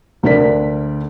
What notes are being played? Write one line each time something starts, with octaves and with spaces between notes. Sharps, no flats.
D2 D3 A#4 D5 B6